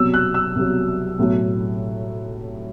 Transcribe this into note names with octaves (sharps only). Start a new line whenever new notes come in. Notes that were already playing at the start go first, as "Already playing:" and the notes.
Already playing: C2 B2 F#3 E6
F#6
E6
C2 B2 F#3
B1 A2 F#3